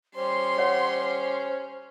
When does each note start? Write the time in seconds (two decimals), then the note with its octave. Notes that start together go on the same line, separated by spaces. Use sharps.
0.15 G3 C#4 C5 C6
0.58 C#5 F#5